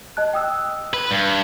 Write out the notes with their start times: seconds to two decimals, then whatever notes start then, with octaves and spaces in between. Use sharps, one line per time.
0.17 D#5 A5 F#6
0.33 G5 D#6 E6
0.94 B4
1.11 G2